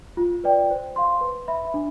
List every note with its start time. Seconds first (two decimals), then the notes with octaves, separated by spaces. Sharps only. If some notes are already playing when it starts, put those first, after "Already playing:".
0.17 F4
0.44 B4 D5 G5
0.70 C5
0.96 F5 C6
1.21 B4
1.48 E5 B5
1.74 D4